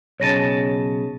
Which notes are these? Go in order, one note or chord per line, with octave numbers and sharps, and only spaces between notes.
B1 C#3 C#5 A5 A#6 D#7